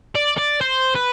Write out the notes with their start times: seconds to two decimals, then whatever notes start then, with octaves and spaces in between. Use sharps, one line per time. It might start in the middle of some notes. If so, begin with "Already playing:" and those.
0.15 D5
0.38 D5
0.61 C5
0.95 B4